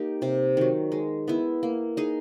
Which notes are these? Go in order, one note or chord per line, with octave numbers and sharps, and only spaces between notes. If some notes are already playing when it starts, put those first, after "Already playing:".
Already playing: A#3 D#4 G4
C3
D#3 F#3
G#3
B3 E4
A#3
D#4 G#4